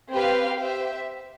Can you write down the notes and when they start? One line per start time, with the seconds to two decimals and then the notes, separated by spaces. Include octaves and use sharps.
0.12 C4 G4 B4 F5
0.58 G4 C5 E5